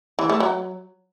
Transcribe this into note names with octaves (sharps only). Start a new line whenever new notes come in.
E3
A3
F#3